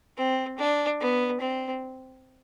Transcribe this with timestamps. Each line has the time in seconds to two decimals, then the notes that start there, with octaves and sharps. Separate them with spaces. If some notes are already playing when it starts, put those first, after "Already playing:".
0.17 C4
0.58 D4
1.01 B3
1.41 C4